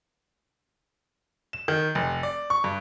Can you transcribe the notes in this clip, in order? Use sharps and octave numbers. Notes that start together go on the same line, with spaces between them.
E7
D#3
F1
D5
C#6
G2